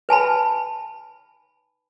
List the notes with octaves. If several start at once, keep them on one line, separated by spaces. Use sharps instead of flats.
B4 G#5 A5 B5